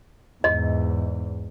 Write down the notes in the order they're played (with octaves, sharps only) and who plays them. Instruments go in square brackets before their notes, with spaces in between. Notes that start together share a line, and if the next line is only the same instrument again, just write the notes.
[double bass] E2 G#2 [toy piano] D#5